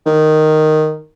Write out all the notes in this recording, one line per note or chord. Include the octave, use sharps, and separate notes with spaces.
D#3